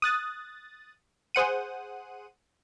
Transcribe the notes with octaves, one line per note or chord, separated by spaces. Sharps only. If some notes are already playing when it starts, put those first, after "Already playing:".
D#6 F#6 A6
G#4 C5 F#5 D#7